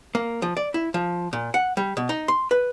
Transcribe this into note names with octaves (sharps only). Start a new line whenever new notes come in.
A#3
F3
D5
E4
F3
A#2
F#5
G3
B2
D#4
C6
B4